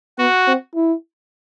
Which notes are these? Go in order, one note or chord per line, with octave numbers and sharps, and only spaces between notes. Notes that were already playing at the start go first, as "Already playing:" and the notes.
B3 F#4
C4
E4